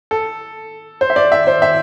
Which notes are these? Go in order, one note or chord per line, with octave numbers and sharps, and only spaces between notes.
A4
C5
E5
D5
E5
C5
E5